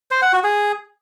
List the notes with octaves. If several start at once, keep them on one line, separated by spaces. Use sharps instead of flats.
C5
F#5
F#4
G#4